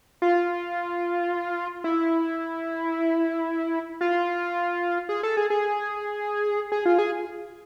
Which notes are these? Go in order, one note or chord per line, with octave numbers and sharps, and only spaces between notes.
F4
E4
F4
G#4
A4
G#4
G#4
G#4
F4
G#4